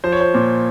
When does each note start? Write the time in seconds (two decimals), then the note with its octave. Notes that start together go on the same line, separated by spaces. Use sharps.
0.04 F3 C5
0.12 C#5
0.21 C5
0.34 A#2